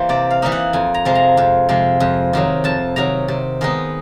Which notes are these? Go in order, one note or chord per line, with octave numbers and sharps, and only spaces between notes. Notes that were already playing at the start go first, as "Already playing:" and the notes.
Already playing: E3 G3 A#3 C5
C3 D5
F5
E3 G3 A#3 D#4
F#5
F2 G#5
A#5
C3 F3 G#3
A#5
F2
C3 F3 G#3
F2
C3 D#3 F#3
F2 A5
C3 D#3 F#3 A#5
C3
D#3 G#3 B3 D#4